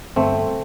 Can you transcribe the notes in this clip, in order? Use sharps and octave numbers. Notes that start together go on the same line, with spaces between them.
G1 A3 C4